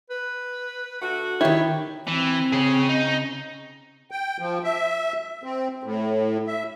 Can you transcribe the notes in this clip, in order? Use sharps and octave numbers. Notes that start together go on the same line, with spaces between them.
B4
D3 A3 F#4
D#3 E4 G4 C#5
E3 C4
C#3 G#4 C#5
D#4
G5
F3
E5
C4
A2
E5